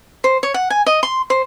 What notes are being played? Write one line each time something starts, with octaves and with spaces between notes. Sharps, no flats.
C5
C#5
F#5
G#5
D#5
C6
C5